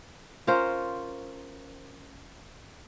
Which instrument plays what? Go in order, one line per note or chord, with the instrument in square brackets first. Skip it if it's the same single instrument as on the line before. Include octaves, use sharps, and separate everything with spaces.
[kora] C#4 F4 A#4 C5